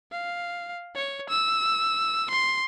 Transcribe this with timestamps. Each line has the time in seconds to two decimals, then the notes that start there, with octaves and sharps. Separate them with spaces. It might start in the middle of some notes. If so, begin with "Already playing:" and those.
0.12 F5
0.96 C#5
1.29 E6
2.30 C6